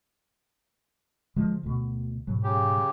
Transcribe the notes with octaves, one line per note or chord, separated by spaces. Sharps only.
D3 F3 G#3
D2 B2
G#2 B2 F#3
C#3 G4